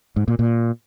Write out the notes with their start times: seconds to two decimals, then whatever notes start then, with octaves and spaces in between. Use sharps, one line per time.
0.16 G#2
0.28 A#2
0.39 A#2